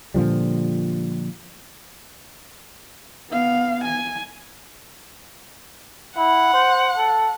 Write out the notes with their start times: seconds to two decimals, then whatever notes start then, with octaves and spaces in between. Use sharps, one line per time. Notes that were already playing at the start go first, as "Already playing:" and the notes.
0.14 A#2 D3 F3 G3
3.30 B3 F5
3.85 G#5
6.17 E4 F#5
6.54 C5
6.97 A4